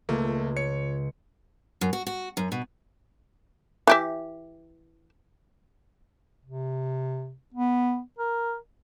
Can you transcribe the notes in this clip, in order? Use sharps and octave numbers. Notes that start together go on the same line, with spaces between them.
C#2 A3 A#3
C#5 C#7
F#2
F#4
F#4
F#2
B2
E3 G4 E5
C3
B3
A#4